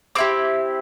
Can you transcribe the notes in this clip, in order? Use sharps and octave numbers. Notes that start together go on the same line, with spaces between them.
C4 E4 G4 D6